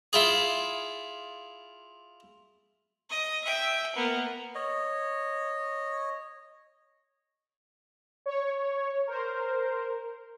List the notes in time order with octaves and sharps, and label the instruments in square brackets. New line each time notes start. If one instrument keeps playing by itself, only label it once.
[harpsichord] E4 F4 G#4
[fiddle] D#5
E5 G5
A#3 B3
[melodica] C#5 D#5
[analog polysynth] C#5
A#4 C5